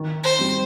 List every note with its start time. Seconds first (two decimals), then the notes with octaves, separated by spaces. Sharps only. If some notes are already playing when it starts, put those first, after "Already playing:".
Already playing: D#3
0.24 C5
0.39 G3 C4